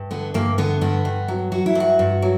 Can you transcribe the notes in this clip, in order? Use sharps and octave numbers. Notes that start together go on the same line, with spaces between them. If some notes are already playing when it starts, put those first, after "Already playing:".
Already playing: G2
D3 B3
G2 A#3
D3 B3
G2 B3
G2
F#3
F#3 F#4
E4
G2 F#4
G2
F#3